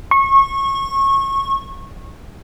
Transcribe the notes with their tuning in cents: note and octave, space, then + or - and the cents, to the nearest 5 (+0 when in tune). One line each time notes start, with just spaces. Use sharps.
C#6 -25